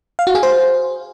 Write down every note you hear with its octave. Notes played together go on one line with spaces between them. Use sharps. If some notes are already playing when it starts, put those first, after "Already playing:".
F5
F#4
G#4
C5